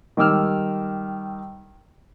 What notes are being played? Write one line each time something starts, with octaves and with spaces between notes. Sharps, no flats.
D#3 G3 D6 E6 F6